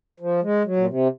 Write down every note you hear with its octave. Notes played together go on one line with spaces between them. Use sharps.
F3
G#3
F#3
A#2
C3